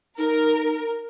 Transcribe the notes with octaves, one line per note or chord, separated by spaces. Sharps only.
D#4 A#4